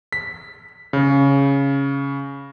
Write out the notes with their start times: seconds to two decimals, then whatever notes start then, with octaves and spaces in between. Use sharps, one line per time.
0.13 B6
0.93 C#3